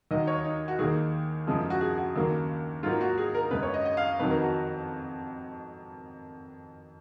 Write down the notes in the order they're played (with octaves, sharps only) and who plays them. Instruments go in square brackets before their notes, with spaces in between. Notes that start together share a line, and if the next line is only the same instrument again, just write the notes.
[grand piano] D#2 D#3 F#3 D#5
C#5
D#4
F#4
D#2 D#3 A#3 G#4
F#2 C#3 F3 G#3
F#4
G#4
F#4
D#2 C#3 F#3 A#3
G#2 F#3 A#3 F4
F#4
G#4
A#4
F#2 C#3 G#3 B4
C#5
D#5
D#5
F5
F2 D#3 F#3 B4
A#4
F#4